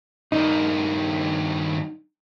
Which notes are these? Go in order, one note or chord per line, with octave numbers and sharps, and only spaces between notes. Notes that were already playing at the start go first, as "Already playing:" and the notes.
G2 D#3 D#4